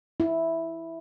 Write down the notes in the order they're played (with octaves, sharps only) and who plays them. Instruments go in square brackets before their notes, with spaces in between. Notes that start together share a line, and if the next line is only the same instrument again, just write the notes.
[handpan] E4